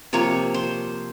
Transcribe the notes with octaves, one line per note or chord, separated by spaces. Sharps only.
C3 F3 A#3 C#5
C5